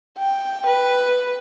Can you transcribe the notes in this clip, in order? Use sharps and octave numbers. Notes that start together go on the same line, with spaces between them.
G5
B4